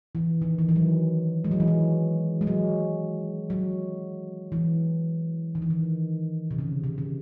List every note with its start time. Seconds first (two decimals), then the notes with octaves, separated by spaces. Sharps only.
0.15 E3
0.42 D#3
0.59 E3
0.69 E3
0.76 F#3
1.44 G#3
1.51 F#3
1.60 E3
1.67 F#3
2.41 G#3
2.47 F#3
3.50 F#3
4.52 E3
5.55 D#3
5.62 E3
5.70 D#3
6.51 C3
6.59 C#3
6.84 C3
6.98 C3